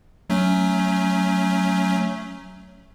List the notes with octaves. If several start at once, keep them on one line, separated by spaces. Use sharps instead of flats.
F#3 A3 C#4